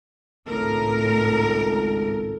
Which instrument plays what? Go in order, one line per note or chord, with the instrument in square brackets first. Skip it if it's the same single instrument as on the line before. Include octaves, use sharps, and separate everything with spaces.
[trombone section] G#1 C#2 A4 [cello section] A2 A#4